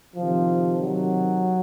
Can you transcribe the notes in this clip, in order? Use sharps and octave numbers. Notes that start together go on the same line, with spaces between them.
C3 D#3 F3
F#3